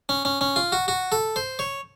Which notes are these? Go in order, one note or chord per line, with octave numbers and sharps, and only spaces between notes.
C#4
C#4
C#4
F4
F#4
F#4
A4
C5
C#5